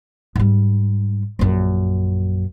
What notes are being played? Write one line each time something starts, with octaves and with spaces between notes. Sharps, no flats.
G#2 G3
A#1 F#2